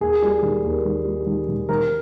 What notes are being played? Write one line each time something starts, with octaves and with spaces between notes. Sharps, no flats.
D#2 G#4
G3
D#3
D#2
D#3
G3
D#3
D#3
D#3 A#4